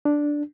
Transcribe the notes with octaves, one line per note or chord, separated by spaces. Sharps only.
D4